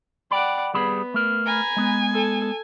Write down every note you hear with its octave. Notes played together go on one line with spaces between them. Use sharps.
D5 F#5 G5 B5
G3 B3 G#4 B5
A3 A#4
G#5 A#5 B5
G#3 B3
A4